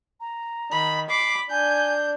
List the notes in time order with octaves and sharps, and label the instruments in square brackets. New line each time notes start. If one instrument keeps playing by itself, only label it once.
[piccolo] A#5
[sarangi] D#3 [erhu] B5
[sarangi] B5 [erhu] D6 [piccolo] C7
[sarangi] D4 [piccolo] G#5 [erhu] G6